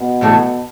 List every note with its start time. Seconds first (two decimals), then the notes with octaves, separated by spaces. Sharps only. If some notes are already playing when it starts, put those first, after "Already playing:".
Already playing: B2
0.21 A2 E3 A3 F#4 A4